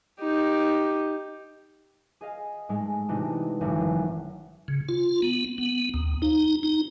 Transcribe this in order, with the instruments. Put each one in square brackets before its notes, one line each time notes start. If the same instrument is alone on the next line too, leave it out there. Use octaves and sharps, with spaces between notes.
[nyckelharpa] D#4 G4
[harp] G#4 D#5 F5
G#2 G#3 A3
C3 E3 A3 D4 D#4 F#4
G#1 F#2 D3 E3 F#3
E3 F#3
[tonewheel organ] C#3
F4
B3
B3
D#2
D#4
D#4